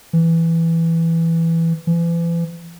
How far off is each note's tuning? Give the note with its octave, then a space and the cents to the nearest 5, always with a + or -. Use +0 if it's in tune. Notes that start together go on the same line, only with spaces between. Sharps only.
E3 +5
E3 +40